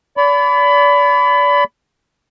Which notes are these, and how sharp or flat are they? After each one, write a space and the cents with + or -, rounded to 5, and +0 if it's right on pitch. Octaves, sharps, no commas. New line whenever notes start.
D5 -35 B5 +20